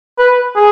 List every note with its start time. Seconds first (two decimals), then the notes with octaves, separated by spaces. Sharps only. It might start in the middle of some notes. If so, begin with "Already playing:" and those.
0.18 B4
0.56 G#4